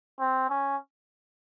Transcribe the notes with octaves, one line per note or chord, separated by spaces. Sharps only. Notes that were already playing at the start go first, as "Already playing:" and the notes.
C4
C#4